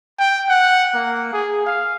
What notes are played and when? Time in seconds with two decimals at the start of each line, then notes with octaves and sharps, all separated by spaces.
0.19 G5
0.49 F#5
0.94 A#3
1.33 G#4
1.66 F5